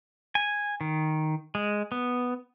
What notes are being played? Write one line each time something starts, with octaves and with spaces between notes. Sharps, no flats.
G#5
D#3
G#3
B3